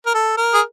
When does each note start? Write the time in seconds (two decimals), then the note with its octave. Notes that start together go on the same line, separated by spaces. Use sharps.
0.06 A#4
0.14 A4
0.37 A#4
0.53 G#4